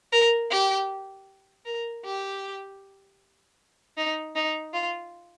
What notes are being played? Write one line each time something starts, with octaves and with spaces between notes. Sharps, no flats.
A#4
G4
A#4
G4
D#4
D#4
F4